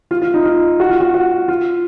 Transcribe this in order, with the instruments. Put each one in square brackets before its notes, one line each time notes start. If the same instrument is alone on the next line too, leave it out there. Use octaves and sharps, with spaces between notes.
[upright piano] F4
F4
D#4
F4
F#4
F4
F#4
F#4
F4